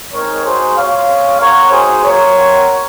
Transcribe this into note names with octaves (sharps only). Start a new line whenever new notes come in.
G#3 C4 D#4 A#4 C#5
G#3 D#4 F#4 G#4 C5
A#3 F4 C#5 F5
G#3 C4 F4
C4 F#4 A#4 C#5
A#3 D#4 F#4 G#4 C5
A#3 F4 A#4 C#5
C4 F#4